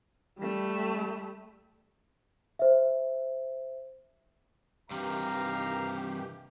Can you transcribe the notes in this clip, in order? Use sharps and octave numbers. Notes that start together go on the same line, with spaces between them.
G3 A3
C5 E5
G2 C3 D#3 E3 G4 F5 A#5